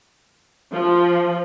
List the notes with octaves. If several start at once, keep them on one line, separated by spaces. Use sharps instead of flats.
F3